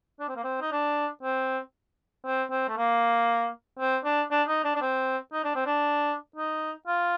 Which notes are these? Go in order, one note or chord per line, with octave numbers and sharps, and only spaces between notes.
D4
C4
A#3
C4
D#4
D4
C4
C4
C4
A3
A#3
C4
D4
D4
D#4
D4
D4
C4
D#4
D4
C4
D4
D#4
F4